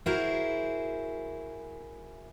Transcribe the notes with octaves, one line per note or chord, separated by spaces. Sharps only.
E4 F#4 G#4 A#4 C5